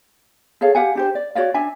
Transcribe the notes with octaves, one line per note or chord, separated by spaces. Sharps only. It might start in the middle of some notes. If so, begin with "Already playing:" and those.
G#4 A4 C#5 F5
G4 F5 F#5 G#5
D4 G4 C5
D5
F#4 C#5 D5 F5
D4 E5 G#5